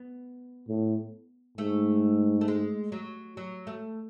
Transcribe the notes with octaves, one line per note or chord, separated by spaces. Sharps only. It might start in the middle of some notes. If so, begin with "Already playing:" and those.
Already playing: B3
A2
G#2 A3
A3
G#3
F#3
F#3
A3